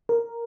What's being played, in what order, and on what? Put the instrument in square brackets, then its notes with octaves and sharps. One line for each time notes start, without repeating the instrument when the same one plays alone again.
[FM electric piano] A#4